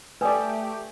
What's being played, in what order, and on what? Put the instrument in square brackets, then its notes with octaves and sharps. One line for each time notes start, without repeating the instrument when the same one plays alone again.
[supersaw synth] A3 G4 [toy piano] B4 D#6 [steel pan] D5 G5 [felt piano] G#5